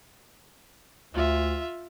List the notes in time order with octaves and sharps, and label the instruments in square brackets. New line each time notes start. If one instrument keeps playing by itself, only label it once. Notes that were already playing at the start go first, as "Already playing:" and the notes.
[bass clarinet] D2 [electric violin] F4 E5